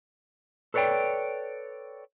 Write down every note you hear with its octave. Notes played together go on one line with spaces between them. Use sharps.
A4 B4 C#5 D5 G5